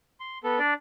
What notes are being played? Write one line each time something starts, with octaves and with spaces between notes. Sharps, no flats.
C6
B3 A4
D4 D5